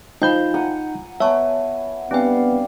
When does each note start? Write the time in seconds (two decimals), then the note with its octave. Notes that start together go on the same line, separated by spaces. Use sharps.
0.22 F3 D#4 G5 B5 G6
0.54 F#5 G#5 A#5
1.20 B3 C#5 E5 G#5 A5 C#6
2.11 G3 B3 C4 D4 F5 G#5